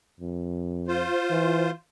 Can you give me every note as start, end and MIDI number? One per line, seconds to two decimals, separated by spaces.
0.20 1.07 41
0.88 1.70 65
0.88 1.70 72
1.30 1.71 52